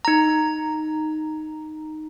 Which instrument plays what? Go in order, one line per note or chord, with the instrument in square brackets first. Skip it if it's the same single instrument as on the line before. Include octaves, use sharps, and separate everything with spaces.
[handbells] D#4 A#5